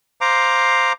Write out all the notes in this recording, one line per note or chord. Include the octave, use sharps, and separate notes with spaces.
C5 F5 A#5 D6